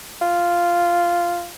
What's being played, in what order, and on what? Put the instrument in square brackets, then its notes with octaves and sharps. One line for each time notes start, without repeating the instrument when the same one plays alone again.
[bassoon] F4